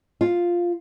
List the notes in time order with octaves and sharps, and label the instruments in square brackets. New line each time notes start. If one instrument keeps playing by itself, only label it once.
[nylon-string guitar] F4